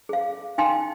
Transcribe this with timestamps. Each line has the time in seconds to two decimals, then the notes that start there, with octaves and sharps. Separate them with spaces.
0.09 G#4 F5
0.58 D#4 F5 G5 G#5 C6